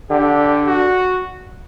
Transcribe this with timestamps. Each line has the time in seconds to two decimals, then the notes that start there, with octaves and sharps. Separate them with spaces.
0.10 D3 G4
0.67 F#4